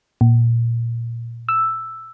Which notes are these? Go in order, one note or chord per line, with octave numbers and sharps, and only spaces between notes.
A#2
E6